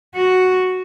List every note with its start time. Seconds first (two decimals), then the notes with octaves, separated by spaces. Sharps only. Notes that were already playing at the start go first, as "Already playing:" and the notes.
0.15 F#4